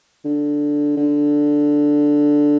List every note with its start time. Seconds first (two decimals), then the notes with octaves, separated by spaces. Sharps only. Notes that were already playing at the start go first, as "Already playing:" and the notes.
0.25 D3
0.97 D3